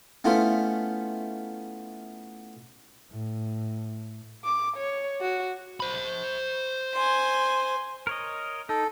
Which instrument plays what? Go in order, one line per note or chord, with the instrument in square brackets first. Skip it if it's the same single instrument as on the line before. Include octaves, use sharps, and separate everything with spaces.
[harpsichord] A3 B3 C#4 E4 F4 C5
[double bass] A2
[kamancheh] D6
C#5
F#4
[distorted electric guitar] C5 B5
[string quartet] G#5 C6
[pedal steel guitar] A#4 C#5 D#5
[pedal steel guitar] D#4 [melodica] A4